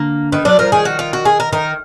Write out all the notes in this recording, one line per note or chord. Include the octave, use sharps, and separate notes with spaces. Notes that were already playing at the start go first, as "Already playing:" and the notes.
Already playing: D3 A#3
D#3 B3
F#3 D4
F3 A#4
D#3 G#4
F#4
F4
F#4
G#4
A#4
D#3 A#4